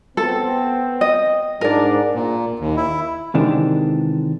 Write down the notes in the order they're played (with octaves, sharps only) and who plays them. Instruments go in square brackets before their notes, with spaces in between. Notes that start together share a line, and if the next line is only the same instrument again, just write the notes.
[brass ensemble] B3 C4 [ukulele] A4
[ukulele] D#5
[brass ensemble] G#2 D4 [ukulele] A#4 D5
[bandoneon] A#2
D#2
E4
[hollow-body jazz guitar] C3 D#3 E3 G#3 D4